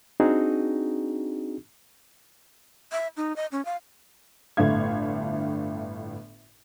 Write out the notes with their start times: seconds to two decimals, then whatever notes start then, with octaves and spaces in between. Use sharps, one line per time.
0.20 C4 D4 D#4 F#4 G#4
2.92 E5
3.17 D#4
3.36 D#5
3.52 C#4
3.65 F5
4.57 G1 A2 A3 D4 F5 G#6